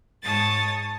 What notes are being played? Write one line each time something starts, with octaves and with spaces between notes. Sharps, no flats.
G#2 C#5 A5 D#6 A6